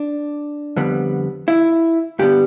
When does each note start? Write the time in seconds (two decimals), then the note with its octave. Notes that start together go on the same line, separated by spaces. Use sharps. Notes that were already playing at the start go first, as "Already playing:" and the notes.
Already playing: D4
0.77 F2 D3 G3 B3
1.48 E4
2.19 G2 D3 G3 B3 G4